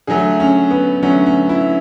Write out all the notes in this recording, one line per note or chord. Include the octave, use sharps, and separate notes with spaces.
D3 F#3 A3 G#4
C#4
B3
D3 F#3 A3 C#4
C#4
E4